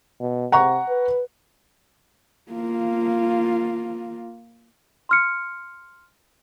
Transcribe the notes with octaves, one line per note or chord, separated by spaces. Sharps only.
B2
C3 F#5 A#5 C#6
B4
A#3 F4
C6 F6 C#7